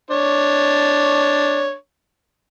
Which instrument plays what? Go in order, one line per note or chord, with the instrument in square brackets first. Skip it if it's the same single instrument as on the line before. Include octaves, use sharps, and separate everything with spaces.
[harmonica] D4 C#5